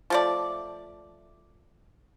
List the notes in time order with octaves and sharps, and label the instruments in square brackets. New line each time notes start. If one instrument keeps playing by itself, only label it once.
[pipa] F3 A3 D5